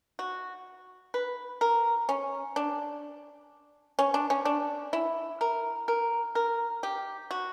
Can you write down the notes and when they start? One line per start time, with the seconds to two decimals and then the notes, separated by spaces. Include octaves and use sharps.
0.19 F#4
1.14 B4
1.61 A#4
2.09 C#4
2.56 D4
3.99 C#4
4.14 D4
4.30 C#4
4.45 D4
4.93 E4
5.41 A#4
5.88 A#4
6.35 A#4
6.83 G4
7.31 F#4